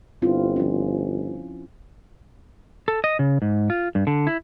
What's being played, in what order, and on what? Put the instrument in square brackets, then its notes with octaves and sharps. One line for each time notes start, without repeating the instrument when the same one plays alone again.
[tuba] G1 [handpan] C4 E4 F4
[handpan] F3 C#4
[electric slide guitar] A4
D#5
C#3
G#2
F4
G2
D3
E4